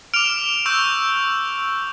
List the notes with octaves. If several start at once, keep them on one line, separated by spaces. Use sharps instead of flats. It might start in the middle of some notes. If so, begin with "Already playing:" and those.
D6 F6 D7 F7
C#6 E6 G6